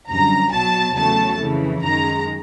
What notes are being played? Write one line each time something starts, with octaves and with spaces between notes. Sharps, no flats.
F#2 D3 G3 A#5
B1 B2 F#3 A5
E2 C#3 F#3 A3 A5
F2 C#3 E3
F#2 D#3 G#3 A#5